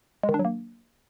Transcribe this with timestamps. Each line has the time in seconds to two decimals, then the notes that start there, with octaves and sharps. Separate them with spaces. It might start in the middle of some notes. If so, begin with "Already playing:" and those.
0.23 G#3
0.29 D#3
0.34 D4
0.39 F#3
0.45 A#3